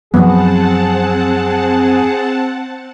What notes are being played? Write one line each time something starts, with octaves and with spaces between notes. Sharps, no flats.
F#2 F3 F#3 B3 C4 G#4 F#5 A5